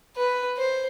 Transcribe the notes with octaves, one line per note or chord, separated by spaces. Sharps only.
B4
C5